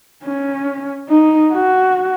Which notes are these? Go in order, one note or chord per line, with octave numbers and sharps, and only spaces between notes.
C#4
D#4
F#4